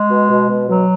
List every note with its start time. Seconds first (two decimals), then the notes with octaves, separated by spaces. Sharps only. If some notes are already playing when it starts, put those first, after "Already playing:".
Already playing: G#3
0.11 B2
0.31 B2
0.50 B2
0.69 B2 F#3